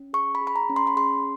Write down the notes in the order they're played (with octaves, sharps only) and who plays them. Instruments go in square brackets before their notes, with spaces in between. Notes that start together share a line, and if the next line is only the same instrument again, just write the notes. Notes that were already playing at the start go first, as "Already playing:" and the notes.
Already playing: [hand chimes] C#4
G#4 C#6
B5
G#4
B5
A#5
C#4
C6
B5
G#4 C6